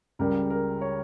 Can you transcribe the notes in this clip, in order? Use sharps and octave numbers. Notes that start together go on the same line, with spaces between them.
C#2 C#3 G3 A#4
A#4
C#5